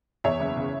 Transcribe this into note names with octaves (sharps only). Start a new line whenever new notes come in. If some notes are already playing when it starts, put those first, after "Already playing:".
E2 C#5 E5
F#1
C#3